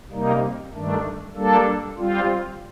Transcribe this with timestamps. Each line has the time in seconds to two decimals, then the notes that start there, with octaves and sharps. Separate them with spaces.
0.10 C3 G3 A#3 D#4
0.73 G2 D#3 A3 D4
1.35 G3 A#3 D4 A4
1.98 G3 C4 F4